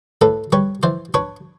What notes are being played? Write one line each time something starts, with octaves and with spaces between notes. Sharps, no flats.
A2 A4 B4
G3 B4 C#5
E3 C5 D5
D4 B4 C#5